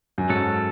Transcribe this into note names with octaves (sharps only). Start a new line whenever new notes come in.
F#2
G#2 F#3 C#4 F#4 A4